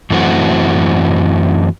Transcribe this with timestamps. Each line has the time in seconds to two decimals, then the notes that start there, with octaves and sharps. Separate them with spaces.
0.10 F#2 E3 A3 C4 F#4